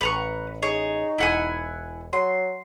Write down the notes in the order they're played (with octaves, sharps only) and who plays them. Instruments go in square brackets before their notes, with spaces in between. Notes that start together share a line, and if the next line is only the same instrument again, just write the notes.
[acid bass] A1 [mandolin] B4 A#5 C#6
[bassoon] D#4 [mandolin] G#4 C#5
[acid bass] E1 [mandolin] E4 F#5 G#5
[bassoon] F#3 [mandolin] C6